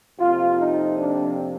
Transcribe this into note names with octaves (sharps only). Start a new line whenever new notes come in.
F2 C3 F3 A#3 F4
D#4
D4